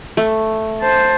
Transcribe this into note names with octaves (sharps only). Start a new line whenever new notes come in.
A3
C5 A5